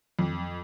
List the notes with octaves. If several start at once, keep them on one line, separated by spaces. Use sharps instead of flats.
F2